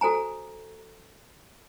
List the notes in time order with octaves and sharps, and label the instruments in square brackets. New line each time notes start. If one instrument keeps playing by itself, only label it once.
[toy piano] F#4 A4 C5 G#5 A#5